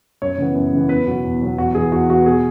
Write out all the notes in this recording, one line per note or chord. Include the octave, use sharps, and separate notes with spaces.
F#2 C#5
C#3 E3 B3
F#2
C#3 E3 B3
E2 B4
B2 F#3 B3
E2
B2 F#3 B3
E2 F#4
E3 B3 G#4
E2 F#4
E3 B3 F#4
B2 G#4